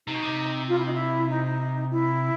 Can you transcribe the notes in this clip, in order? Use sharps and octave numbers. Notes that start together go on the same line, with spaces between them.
C3 D#4
B2
C3
F4
E4
D#4
E4
D#4
E4